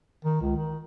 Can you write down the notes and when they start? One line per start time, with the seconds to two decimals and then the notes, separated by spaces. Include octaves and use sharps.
0.25 D#3
0.41 C#2
0.56 D#3